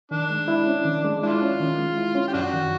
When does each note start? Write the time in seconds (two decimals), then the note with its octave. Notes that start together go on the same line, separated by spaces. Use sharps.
0.11 D#3 D4
0.30 G#3
0.48 E4
0.67 C#4
0.85 D#3
1.04 G#3
1.23 D4 E4 F4
1.42 C#4
1.60 D#3
1.78 G#3
1.97 E4
2.15 C#4
2.28 G4
2.34 F#2 D4 F#4
2.53 D#3